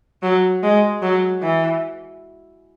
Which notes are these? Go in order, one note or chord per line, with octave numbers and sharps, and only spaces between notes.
F#3
G#3
F#3
E3